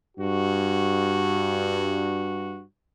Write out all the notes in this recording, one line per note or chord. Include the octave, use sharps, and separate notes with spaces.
G2 F#4